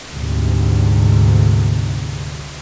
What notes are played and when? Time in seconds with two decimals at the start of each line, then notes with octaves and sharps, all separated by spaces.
0.13 D2 G#2 C3